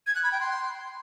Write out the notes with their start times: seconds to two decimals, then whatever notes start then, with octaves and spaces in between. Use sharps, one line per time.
0.06 G#6
0.15 F#6
0.23 B5
0.31 G5
0.40 C6